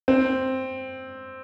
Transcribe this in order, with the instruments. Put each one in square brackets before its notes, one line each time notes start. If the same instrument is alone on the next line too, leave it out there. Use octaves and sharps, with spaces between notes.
[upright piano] C4